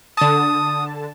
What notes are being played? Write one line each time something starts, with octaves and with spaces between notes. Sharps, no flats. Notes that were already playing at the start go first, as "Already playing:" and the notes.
D3 A5 D#6